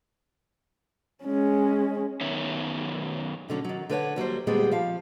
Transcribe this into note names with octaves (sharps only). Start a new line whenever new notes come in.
G#3 C#4
F#2 D#3 B3 D#4 C#5 E5
B2 D3 F#3 C#4
D#3 F#3
D3 B4 C#5 F#5
D#2 F#3 G3 C5
D2 A#2 G3 G#3 B3 C4
F3 F5